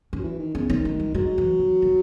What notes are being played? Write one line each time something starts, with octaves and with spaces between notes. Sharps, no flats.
C#4
F#3
E3
D#3
C#3 B3
D#3 C#4
A3
G#3
F#3 G#3
E3
E3
D#3